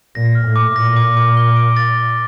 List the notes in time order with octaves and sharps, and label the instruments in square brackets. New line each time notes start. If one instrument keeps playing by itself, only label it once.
[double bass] A#2 [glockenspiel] A#6
[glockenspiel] F6
[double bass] A2
[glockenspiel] D6
[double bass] A#2 [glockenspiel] A#6
[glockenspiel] D6
D6
G7
D7
A6
G7